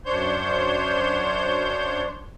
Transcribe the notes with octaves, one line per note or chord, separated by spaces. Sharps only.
F#2 D4 C5 C#5 C6 G6